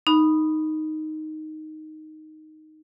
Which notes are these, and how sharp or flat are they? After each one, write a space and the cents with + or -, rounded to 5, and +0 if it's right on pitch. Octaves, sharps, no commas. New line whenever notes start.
D#4 +0 B5 +0